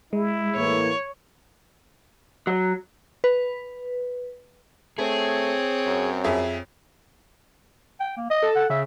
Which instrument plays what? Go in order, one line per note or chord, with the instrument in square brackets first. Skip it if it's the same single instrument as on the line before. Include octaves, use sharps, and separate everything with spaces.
[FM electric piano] G#3 [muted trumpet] E4
[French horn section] A2 E3 A#3 [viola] C#5
[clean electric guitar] F#3
[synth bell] B4
[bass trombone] A3 [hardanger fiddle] C4 C#5 [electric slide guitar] G#4
[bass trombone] F#2
[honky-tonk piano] F2 G#4 E5
[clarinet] G5
A#3
D#5
[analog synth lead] A4
[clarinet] F#5
[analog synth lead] C#3 [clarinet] E5